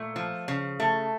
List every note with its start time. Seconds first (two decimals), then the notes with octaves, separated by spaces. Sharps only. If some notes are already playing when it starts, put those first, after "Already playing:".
Already playing: A#2 A3
0.16 F3
0.48 C#3
0.80 A3